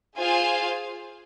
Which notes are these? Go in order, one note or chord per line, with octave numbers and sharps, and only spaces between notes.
F4 G#4 C5 F5 G#5